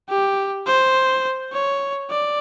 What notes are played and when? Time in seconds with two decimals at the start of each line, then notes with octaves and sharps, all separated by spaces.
0.09 G4
0.67 C5
1.52 C#5
2.10 D5